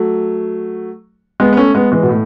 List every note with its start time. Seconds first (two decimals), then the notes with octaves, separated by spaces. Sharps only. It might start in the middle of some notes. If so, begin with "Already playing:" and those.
Already playing: F#3 A3
1.40 G#3 B3
1.53 B3
1.57 A3 C#4
1.75 G#3 B3
1.92 E3 G#3
2.03 B2
2.09 A2